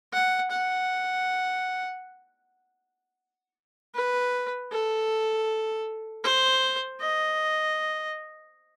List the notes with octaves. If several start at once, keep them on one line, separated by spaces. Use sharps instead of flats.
F#5
F#5
B4
A4
C5
D#5